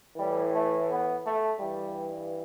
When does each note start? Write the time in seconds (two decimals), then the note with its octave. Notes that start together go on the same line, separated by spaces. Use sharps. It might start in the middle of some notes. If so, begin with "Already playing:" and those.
0.17 A2 E3 G3
0.52 A3
0.89 B3
1.24 A3
1.58 G2 E3 G3